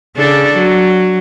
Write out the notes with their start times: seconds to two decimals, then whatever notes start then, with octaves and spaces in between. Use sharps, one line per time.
0.16 C#3 D4 A4
0.56 F#3